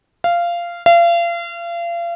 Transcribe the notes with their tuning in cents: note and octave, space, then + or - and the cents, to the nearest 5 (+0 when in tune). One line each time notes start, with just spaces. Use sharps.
F5 -15
F5 -35